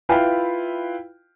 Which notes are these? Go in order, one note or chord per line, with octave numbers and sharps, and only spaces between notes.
E4 F4 B4 F5 G5 B5